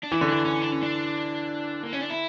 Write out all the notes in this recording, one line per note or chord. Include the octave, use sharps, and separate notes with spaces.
D4
E3 E4
D3 C#4
E3 D4
C#4
D4
C#4
D4
A#3
C#4
D4
E4